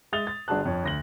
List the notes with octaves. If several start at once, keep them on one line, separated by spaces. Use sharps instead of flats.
G#3 E5 D#6 A6 F7 G7
A6
G1 D4 F#4 G#4 A5 F#6
F2 C#5
D2 A#6 F#7